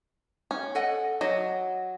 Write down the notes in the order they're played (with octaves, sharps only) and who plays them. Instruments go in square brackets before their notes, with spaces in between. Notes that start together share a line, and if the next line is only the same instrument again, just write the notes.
[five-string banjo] C#4
[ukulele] A4 D#5 F#5
[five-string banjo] F#3 [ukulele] D#5